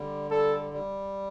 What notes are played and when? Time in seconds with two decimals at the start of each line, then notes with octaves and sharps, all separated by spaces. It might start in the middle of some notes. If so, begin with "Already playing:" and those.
Already playing: D3 G3
0.31 G3 A4
0.73 G3